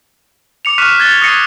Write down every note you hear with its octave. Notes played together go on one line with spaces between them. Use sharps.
D6 C#7 F7
C#6 F6 F#6 B6 D#7 E7
F#6 G#6 A6 G7
D#6 G#6 A#6 C7 C#7 D#7